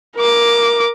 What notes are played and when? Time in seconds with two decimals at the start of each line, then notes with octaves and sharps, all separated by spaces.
0.16 A#4 D6